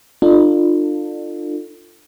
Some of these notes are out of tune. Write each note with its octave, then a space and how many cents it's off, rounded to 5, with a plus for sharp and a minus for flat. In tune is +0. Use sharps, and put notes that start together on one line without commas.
D4 +40 F4 +0 A4 +25